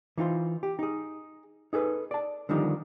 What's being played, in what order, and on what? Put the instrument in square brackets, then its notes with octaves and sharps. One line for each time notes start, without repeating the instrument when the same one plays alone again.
[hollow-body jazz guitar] E3 D#4 F4 C5
G4
D#4 G#4
D#4 G#4 A4 B4
D5 A5
D3 D#3 F3 G3 D#4